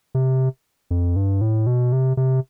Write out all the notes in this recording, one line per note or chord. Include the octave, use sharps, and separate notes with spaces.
C3
F2
G2
A2
B2
C3
C3